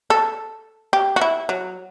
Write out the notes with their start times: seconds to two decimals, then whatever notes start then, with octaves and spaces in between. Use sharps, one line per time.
0.10 A4
0.93 G4
1.16 F#4
1.21 E4
1.49 F#3